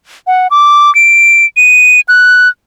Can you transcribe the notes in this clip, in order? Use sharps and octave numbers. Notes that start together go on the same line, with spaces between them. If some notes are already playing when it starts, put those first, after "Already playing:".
F#5
D6
D7
D#7
F#6